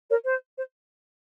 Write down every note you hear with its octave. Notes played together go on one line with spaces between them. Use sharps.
A#4 C#5
C5
C5